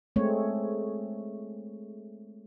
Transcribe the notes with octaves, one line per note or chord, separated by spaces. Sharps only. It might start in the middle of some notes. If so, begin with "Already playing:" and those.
G#3 A3 C4 C#5